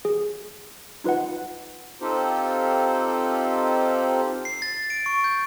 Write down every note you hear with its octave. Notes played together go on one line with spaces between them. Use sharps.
G#4
D#4 F4 B4 D#5 F#5
C4 D#4 F4 G4 A4 C5
C7
A6
D7
C#6
G6